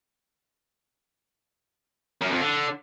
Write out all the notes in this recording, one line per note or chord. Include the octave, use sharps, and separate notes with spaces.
F#2
F2
D3